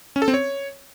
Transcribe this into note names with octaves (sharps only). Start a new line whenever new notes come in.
C#4
A4
C4
C#5